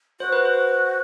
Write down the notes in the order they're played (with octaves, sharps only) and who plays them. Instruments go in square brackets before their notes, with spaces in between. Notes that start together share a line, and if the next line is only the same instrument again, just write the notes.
[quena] F#4 [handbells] C5
[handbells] B4
C5